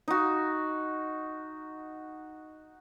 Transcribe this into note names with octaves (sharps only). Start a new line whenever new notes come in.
D#4 F#4